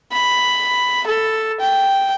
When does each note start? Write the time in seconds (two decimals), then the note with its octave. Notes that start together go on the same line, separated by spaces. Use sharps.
0.13 B5
1.07 A4
1.60 G5